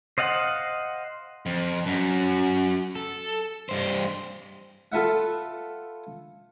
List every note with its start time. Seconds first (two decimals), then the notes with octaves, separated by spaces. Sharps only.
0.18 C5 D#5 F5 F#5
1.46 F2
1.86 F#2
2.96 A4
3.69 G2 C5
4.92 F4 A4 B4 E5 F#5